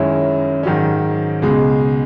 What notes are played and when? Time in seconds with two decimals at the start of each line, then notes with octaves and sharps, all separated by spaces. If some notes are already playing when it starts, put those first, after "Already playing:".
Already playing: F#2 D#3 G#3 C#4 E4
0.63 G#2 D#3 F#3 C#4
1.42 C#2 B2 G#3